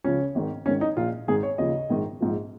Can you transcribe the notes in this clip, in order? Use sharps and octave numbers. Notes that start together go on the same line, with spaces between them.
C#2 C#3 F3 C#4
G#1 G#2 D#3
G#1 G#2 D#3 C#4
D#4
A#1 A#2 F3 F4
G#1 G#2 D#3 G#4
C#5
D#2 C#3 F3 D#5
A#1 G#2 D#3
A#1 G#2 F3